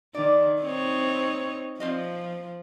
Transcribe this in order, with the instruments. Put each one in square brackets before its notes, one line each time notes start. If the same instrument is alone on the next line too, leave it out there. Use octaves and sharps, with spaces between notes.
[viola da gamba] D#3 [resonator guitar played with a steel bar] D5
[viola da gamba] C4 D#4 C#5
[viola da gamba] F3 [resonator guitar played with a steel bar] C4 F4 D#5